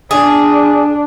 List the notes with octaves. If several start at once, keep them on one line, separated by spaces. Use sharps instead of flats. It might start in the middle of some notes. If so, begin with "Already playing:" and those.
D4 G#4